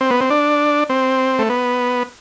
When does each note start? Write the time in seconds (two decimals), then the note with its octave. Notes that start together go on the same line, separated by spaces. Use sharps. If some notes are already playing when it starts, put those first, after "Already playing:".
0.01 C4
0.10 B3
0.21 C4
0.30 D4
0.90 C4
1.39 A3
1.50 B3